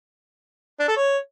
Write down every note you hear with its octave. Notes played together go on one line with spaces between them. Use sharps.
D4
A4
C#5